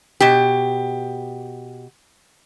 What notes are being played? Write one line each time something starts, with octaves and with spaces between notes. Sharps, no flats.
B2 G4